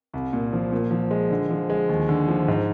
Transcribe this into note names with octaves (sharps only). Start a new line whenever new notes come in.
C2
A#2
F3
A#2
F3
G#3
D3
F3
G#3
D#2
D3
F3
G#2